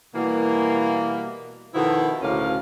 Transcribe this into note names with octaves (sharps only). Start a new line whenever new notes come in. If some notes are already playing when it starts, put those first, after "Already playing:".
B2 E3 G3 A#3
B2 D#3 F3 B3 E4 A4
D2 A2 C#3 A#3 C#4 F5